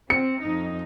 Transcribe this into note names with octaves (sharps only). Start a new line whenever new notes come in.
C4 C#7
F2 D#4